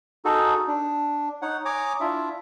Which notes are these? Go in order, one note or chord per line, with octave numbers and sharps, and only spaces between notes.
D#4 F#4 G#4 A4
D4
D#4 C#5 F#5
C#5 G#5 A#5 D6 D#6
D4 E4 F4 E5